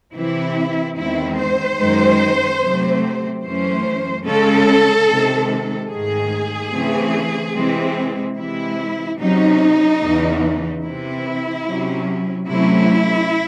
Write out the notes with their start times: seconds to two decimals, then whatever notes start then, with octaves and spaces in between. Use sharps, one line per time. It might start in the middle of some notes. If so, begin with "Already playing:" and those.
0.14 C3 E3 C4 E4
0.97 E2 D#3 G#3 C4 E4
1.38 C5
1.79 F#2 D#3 G#3
2.61 C3 F#3 A3 C4
3.43 F#2 E3 A3 C#4 C5
4.25 C#3 G#3 C#4 A4
5.08 C3 D#3 G#3
5.90 G#2 D#3 A3 G#4
6.72 C#3 E3 A3 C4
7.55 C3 E3 G#3 C4
8.37 C3 E3 G#3 E4
9.19 C3 F#3 C#4 D#4
10.01 E2 C#3 E3
10.83 C3 E3 C4 E4
11.66 C3 F#3 C#4
12.47 C3 F#3 A3 C#4 E4